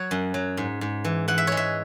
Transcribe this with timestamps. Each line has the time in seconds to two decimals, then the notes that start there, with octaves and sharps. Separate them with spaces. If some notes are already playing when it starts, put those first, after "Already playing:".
Already playing: F#3 C#5
0.11 F#2
0.34 F#3
0.57 G#2
0.81 G#2
1.04 E3
1.28 E3 F#5
1.38 E5
1.47 G#3 C#5
1.57 E5